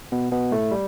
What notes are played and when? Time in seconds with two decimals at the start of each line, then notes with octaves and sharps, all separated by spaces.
0.12 B2 B3
0.32 B2 B3
0.51 A2 A3
0.71 G3